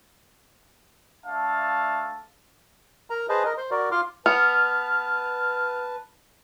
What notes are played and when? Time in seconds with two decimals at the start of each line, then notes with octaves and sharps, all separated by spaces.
1.26 A3 D4 E5 F5 A5
3.10 A#4 A#5
3.29 G#4 B4 C5 D#5 A5
3.45 A#4 D#5
3.58 C5 C6
3.71 F#4 A#4 D5
3.91 F4 C6 D6 F6
4.26 B3 B4 A5 F6